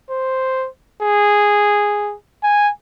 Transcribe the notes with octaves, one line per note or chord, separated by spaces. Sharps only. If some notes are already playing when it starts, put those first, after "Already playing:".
C5
G#4
G#5